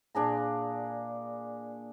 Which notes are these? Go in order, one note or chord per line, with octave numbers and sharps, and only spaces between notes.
A#2 D4 G#4 A#5